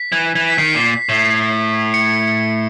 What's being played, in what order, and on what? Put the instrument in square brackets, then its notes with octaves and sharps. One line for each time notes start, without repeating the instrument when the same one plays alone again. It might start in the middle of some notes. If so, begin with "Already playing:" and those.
Already playing: [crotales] B6
[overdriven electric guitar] E3
E3
[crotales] B6
[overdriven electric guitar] D#3 [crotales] C7
[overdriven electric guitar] A#2
A2
[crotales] C#7
C#7